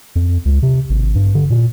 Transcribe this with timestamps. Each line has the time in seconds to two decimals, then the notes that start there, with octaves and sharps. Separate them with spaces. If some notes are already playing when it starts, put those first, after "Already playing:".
0.15 F2
0.45 C#2
0.62 C3
0.90 G#1
1.15 G2
1.35 D3
1.50 A#2